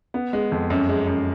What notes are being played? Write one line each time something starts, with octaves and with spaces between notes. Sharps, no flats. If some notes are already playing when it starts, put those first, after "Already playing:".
B3
G#3
F2
F#2
G#3
F#2